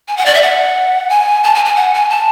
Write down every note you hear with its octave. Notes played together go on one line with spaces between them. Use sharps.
G#5
F#5
D5
E5
F#5
G#5
A5
G#5
G#5
F#5
G#5
A5